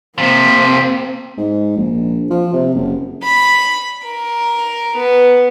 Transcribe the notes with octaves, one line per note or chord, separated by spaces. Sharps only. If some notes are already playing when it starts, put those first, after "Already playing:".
C3 F3 A#3 C4 B6
G#2
A#1
F3
C3
F#1
B5
A#4
B3